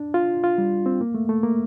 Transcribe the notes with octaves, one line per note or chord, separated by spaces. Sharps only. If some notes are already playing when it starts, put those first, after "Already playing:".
Already playing: D4
F4
F4
G3
C4
A#3
A3
A3
A#3